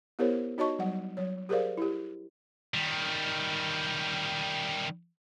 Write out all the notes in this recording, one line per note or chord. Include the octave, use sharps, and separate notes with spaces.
B3 E4 G4 A#4 C5 C#5
D#4 F#4 C#5 D#5 A5 C#6
F#3 G3 F#5
F#3 C#5
G4 G#4 A#4 C5 D5 F5
E4 G4
D#3 G3